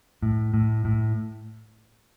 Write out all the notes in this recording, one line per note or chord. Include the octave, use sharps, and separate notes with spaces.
A2
A2
A2